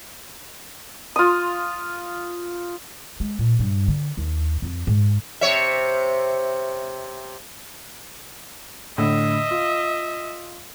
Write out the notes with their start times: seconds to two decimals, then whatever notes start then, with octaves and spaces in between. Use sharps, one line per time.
1.16 F4 D#6
3.20 G#3
3.39 A#2
3.59 G2
3.88 D3
4.17 D#2
4.62 F2
4.87 G#2
5.41 C3 C#5 E5
8.98 A2 D3 D#5 E5
9.51 F4